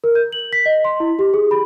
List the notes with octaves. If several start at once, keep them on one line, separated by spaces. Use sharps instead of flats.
A#4
G6
F#7
B6
D#5
C6
E4
G4
G#4
B5